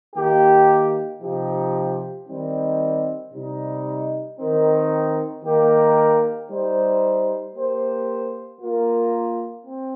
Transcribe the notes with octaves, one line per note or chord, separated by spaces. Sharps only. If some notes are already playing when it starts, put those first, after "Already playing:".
D#3 A#3 G4
C3 F3 D#4 G4
D#3 G3 C4 D#4
C3 G3 D#4
D#3 C4 D#4 A#4
D#3 A#3 G4 A#4
G3 D#4 C5
A#3 G4 C5
A#3 F4 A#4
C4